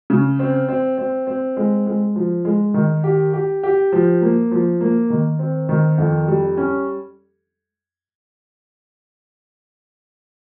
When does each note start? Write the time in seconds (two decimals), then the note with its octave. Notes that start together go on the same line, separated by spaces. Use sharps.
0.10 C#3
0.39 C4
0.69 C4
0.98 C4
1.27 C4
1.57 G#3
1.87 G#3
2.16 F3
2.45 G#3
2.74 D#3
3.04 G4
3.33 G4
3.63 G4
3.92 F3
4.22 A#3
4.51 F3
4.81 A#3
5.10 D#3
5.39 C4
5.69 D#3
5.98 F2
6.28 G3
6.57 C#4